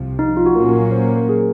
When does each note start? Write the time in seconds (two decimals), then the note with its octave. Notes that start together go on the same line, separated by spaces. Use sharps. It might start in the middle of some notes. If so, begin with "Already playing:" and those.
Already playing: C2 C3 F3
0.19 D#4
0.37 F4
0.46 F#4
0.55 A#2 F#3 A#3 C#4 A#4
0.92 C5
1.04 A#4
1.17 A#4
1.29 G#4